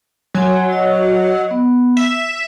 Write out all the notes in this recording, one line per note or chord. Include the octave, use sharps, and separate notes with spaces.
F#3 C#5 G#5 C6
D#5
B3
E5 E6